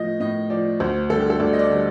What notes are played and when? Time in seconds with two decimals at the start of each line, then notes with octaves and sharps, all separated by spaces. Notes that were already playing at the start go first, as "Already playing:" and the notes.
Already playing: A2 F3 D#5
0.20 A2 D#5
0.50 F3 D5
0.80 D2 C5
1.10 D3 G3 A4
1.20 G4
1.30 A4
1.40 D2 D5
1.53 D#5
1.59 D5
1.70 D3 G3